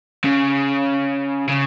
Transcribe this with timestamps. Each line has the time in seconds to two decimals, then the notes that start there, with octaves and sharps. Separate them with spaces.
0.24 C#3
1.49 C#3